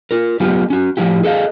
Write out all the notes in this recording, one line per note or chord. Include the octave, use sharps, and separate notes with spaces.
F4 A#4
F#3 A3 B3 F4 G4
C#4 F#4
A2 F3 C#4 E4 G4
G#4 A4 D#5 F5